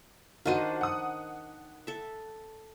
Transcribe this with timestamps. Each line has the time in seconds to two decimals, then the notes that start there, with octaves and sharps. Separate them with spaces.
0.45 D#3 D4 F4 F#4 C5 D#7
0.81 F#5 D#6
1.87 A4 E5